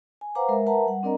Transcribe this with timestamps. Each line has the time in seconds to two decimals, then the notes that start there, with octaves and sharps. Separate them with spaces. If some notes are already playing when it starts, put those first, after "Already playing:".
0.21 G#5
0.35 B4 C5 F5 F#5 A#5 D6
0.48 G#3 A#4 E5
0.66 A#4 B4 E5 F#5 A5 A#5
0.87 G3 F#5
1.03 C4 D4 A#4 D5 D#5 A#5